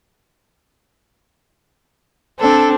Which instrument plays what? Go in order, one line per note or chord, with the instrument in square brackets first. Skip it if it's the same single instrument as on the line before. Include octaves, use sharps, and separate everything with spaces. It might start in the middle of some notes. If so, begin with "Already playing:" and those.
[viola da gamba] C4 D4 [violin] A4